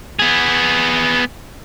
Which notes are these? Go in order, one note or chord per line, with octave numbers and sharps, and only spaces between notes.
B3 G#4